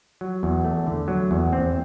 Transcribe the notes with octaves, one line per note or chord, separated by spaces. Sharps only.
F#3
E2
A3
D3
F#3
E2
C4